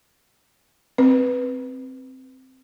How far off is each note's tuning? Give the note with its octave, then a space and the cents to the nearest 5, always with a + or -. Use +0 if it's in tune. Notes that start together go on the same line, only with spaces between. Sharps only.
C4 +0 B4 +0